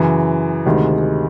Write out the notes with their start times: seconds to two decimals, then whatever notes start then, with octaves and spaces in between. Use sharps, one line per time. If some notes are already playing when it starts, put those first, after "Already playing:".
Already playing: F#2 C#3 E3
0.66 D2 C3 D#3 G#3